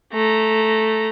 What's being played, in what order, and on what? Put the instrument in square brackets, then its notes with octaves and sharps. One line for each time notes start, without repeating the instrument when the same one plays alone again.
[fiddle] A3 A#5